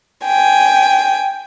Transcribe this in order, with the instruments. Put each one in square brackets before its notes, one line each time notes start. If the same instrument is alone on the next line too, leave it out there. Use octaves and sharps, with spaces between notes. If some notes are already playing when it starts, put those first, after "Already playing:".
[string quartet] G5 G#5